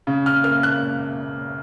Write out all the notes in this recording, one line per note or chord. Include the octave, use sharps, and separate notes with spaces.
C#3
F6
A#3 F6
F#6